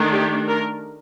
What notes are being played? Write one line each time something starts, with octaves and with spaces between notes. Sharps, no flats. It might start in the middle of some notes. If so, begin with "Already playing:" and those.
Already playing: D#3 A3 D4
G4
A#4